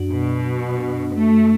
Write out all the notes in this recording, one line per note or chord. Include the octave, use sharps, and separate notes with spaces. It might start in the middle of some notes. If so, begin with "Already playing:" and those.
Already playing: F#2 D4 F#4
B2
A3